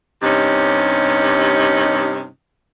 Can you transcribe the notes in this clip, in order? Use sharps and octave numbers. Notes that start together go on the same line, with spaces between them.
G2 C3 C#4 D#4